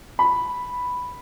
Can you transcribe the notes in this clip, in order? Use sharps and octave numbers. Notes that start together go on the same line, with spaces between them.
B5